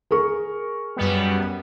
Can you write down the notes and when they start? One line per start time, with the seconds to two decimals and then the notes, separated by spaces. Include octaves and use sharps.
0.11 G#4 A#4 C#6
0.96 F#2 G3 B3